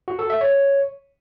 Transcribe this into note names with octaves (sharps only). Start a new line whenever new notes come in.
F#4
A4
E5
C#5